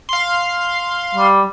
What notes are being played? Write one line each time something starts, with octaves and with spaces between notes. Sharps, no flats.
F5 C6
G3